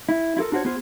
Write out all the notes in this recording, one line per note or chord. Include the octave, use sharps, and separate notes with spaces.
E4
E4 F4 G4 A4 A#4
D4 F4 F#4 A#4 C5 C#5
B3 F4 G#4 C5